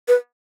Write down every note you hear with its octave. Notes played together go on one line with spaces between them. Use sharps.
B4